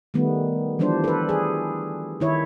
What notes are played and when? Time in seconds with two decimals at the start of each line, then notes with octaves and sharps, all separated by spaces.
0.14 D#3 G3 A3 B3
0.79 E3 F3 G3 D4 C5
1.04 A4 B4
1.29 G#4
2.20 D#3 E4 C#5